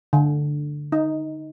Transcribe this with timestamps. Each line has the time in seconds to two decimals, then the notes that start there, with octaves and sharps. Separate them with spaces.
0.13 D3
0.92 D#4